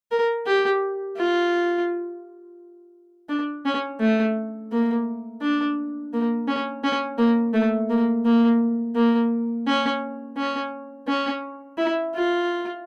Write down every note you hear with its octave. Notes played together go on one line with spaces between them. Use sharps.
A#4
G4
F4
D4
C#4
A3
A#3
D4
A#3
C#4
C#4
A#3
A3
A#3
A#3
A#3
C#4
C#4
C#4
E4
F4